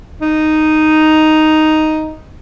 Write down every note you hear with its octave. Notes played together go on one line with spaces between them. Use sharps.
D#4